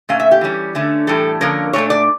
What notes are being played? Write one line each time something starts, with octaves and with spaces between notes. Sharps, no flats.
A#2 A3 C#4 F5
E5
G4
E3 G3 C#4
D3 A3 C#4
A2 E3 G3 A4
D3 F3 A#3 C#4 A#4
A#2 A3 D4 C#5
D5